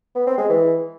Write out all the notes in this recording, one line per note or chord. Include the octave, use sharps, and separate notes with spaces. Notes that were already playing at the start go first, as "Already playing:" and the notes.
B3
C4
G#3
E3